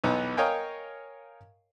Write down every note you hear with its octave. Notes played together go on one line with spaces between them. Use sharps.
B1 E2 B3 D#4
A#4 C#5 D#5 F5 G5 G#5